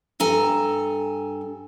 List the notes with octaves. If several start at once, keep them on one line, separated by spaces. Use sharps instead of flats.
G2 A4 G#5 A#5